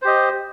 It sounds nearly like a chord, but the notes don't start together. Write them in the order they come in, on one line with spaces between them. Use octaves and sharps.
C5 G4 D#5